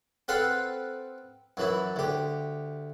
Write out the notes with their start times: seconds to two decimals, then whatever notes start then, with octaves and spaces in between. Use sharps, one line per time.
0.28 C4 A4 B4 C5 F5 F#5
1.57 F#2 E3 E4
1.96 D2 G4